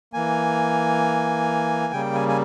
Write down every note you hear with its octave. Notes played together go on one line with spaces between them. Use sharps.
E3 A#3 G#5
C#3 G3 A#3 G5
G#5
G#5